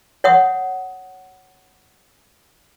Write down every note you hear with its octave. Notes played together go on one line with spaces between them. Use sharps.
C#5 F#5 D#6